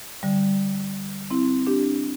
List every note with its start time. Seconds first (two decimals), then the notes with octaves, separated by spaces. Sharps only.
0.23 D3 G3
1.31 C4 E4
1.67 D4 G4